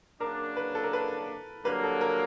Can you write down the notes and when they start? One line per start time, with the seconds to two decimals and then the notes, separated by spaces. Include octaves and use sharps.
0.21 C#3 F#3 A#3 D4 A#4
0.57 B4
0.75 A4
0.83 A#4
0.93 B4
1.65 G2 D3 F#3 A#3 B4
1.84 A4
2.01 A#4